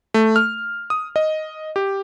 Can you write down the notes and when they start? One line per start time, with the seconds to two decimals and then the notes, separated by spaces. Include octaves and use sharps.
0.14 A3
0.36 F6
0.90 D#6
1.16 D#5
1.76 G4